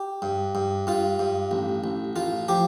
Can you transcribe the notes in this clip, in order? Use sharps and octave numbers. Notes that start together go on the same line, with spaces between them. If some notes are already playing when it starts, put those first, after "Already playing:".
Already playing: G4
G2
G2
G2 F4
G2
A1
A1
A1 F4
F3 G4